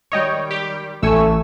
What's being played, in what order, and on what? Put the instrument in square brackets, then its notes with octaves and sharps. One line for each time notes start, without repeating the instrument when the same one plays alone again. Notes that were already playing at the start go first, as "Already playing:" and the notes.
[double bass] D#3 G3 [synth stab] C#5 D#5 G5
[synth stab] G4
[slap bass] A1 [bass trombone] A3 [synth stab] G#5 C#6 E6